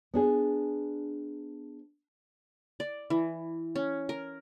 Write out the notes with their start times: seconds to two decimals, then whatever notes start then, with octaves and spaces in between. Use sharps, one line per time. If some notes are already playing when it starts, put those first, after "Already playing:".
0.14 B3 D4 G#4
2.80 D5
3.10 E3
3.76 C#4
4.09 A#4